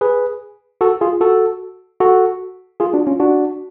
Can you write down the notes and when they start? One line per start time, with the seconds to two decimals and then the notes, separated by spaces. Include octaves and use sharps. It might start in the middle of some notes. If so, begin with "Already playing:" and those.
0.01 G#4 B4
0.81 F#4 A4
1.01 F4 G#4
1.21 F#4 A4
2.00 F#4 A4
2.80 F4 G#4
2.93 D4 F#4
3.07 C#4 F4
3.20 D4 F#4